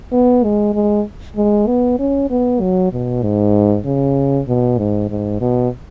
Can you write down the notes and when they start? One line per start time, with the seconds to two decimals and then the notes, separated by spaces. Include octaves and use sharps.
0.12 B3
0.43 G#3
0.74 G#3
1.36 G#3
1.67 B3
1.99 C#4
2.30 B3
2.60 F#3
2.92 B2
3.23 G#2
3.85 C#3
4.47 B2
4.78 G#2
5.10 G#2
5.40 B2